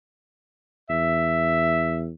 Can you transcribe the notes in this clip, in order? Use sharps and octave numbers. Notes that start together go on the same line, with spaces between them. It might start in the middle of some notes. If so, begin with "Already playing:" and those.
E2 E5